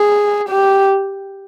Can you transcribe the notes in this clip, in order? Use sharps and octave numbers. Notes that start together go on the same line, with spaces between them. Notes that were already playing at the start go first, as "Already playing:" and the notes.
Already playing: G#4
G4